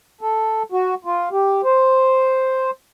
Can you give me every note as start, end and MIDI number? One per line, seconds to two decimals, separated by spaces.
0.21 0.63 69
0.72 0.94 66
1.05 1.29 65
1.32 1.61 67
1.64 2.71 72